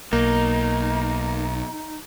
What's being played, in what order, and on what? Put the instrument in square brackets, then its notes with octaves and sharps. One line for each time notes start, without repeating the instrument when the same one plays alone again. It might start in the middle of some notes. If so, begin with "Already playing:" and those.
[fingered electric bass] B1 [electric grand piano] A#3 [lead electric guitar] D#4